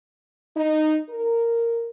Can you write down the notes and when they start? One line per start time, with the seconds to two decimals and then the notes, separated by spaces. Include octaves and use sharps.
0.56 D#4
1.09 A#4